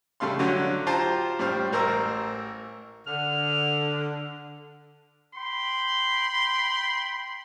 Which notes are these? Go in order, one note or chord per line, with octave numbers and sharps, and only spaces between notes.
C#3 G3 A3 F5 C6
D3 F#3 C#5
F4 G4 C5 F5 A5 A#5
A2 G3 C5 F6
A1 A#4 C5 A#5 E6
D3 F6
G5 B5 C6